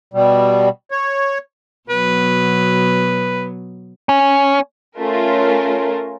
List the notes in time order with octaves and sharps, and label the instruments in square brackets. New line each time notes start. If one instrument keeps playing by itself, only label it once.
[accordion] B2 G3
C#5
[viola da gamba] B2 F#3 B3 [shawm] B4
[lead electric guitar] C#4
[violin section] A3 C#4 F4 A#4